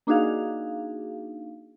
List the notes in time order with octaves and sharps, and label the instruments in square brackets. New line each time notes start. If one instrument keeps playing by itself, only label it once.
[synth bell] A#3 D4 D#4 F#4 G#4 F5